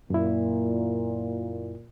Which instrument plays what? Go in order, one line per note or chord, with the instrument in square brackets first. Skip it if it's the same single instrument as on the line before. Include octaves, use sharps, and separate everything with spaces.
[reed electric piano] F#2 E4 [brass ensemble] A#2